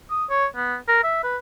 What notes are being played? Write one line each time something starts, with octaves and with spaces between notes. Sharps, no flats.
D#6
C#5
B3
A#4
E5
B4